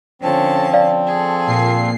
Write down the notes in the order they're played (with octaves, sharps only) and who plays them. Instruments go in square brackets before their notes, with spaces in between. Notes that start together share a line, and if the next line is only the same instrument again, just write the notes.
[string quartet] D3 C#4 A5 [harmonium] F3 C4
[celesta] D5 F5
[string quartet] G#4 A4
[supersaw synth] A#2 C7